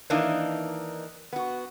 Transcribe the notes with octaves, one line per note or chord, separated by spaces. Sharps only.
D#3 E3 A#3 D4 D#4
B3 F#4